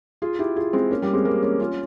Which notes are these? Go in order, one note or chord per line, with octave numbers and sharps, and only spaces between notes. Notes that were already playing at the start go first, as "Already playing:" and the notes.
F4 G#4
E4 G4
F4 G#4
G#3 C4
A#3 C#4
G3 A#3
G#3 C4
G3 A#3
A#3 C#4
C#4 F4